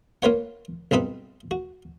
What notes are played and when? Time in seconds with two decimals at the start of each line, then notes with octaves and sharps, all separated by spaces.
0.22 A#3 F4 B4 C#5 F#5
0.91 B1 G2 C4 D#4 B4
1.51 F#4